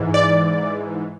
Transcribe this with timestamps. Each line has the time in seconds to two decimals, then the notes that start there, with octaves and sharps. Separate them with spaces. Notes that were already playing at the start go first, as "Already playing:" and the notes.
Already playing: G#2 E3
0.14 D5